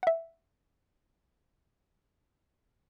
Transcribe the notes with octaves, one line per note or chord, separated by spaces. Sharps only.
E5 F#5